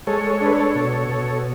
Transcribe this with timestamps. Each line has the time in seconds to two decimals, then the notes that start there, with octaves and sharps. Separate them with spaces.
0.07 G#3 A4 C#5
0.30 A4 C#5
0.41 D4 B4
0.53 A4 C#5
0.75 B2
1.09 B2